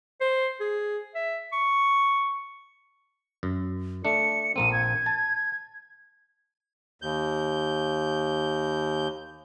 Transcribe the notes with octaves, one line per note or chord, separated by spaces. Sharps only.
C5
G#4
E5
C#6
F#2
A3 D4 C#7
A#1 A#3 C4 D#7
G#6
A5
D#2 G6